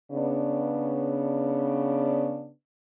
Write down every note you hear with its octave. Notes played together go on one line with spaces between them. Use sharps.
C#3 B3 D4